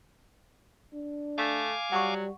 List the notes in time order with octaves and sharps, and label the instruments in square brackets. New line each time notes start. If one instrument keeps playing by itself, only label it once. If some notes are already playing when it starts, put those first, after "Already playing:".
[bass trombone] D4
[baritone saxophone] A3 [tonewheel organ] F5 G#5 D6
[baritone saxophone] F#3 [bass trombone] G3 [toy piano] F#5 C#6